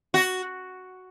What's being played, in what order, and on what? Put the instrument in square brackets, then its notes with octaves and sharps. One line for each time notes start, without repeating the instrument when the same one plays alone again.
[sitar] F#4